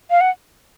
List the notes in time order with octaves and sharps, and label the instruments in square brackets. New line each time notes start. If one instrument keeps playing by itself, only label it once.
[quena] F5
F#5